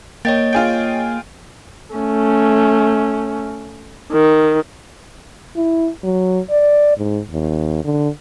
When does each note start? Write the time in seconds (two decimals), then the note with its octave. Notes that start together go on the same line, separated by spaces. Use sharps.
0.25 A#3 C#5 D#5 G5 A6
0.53 F4 G#4 G5
1.95 A3 C#4
4.13 D#3
5.56 E4
6.04 F#3
6.50 D5
6.98 G#2
7.30 D#2
7.84 D3